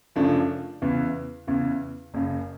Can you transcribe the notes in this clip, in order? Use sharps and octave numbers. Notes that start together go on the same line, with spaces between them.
F#2 C#3 F3 A3 D4
E2 C#3 E3
E2 C#3 E3
F#1 F#2 C#3